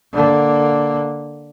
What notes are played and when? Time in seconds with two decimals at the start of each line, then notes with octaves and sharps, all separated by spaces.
0.13 D3 A#3